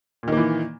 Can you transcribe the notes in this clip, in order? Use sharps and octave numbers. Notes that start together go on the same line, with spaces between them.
A#2 D#3 E3 A#3